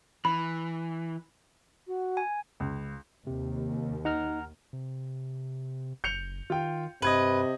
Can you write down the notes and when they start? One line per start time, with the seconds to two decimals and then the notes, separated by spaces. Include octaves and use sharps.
0.25 E3 B5
1.87 F#4
2.17 G#5
2.60 C#2
3.27 D#2 C3
4.05 D#4 F#5 A#5 F6
4.73 C3
6.04 F#1 G6 C#7 F7
6.50 D#3 F4 G5
7.02 G2 C3 B4 D#5 G#6 F#7